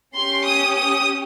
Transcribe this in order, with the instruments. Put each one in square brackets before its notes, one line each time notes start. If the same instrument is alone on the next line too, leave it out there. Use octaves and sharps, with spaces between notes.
[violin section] C#4 G4 C6
D#6
D#6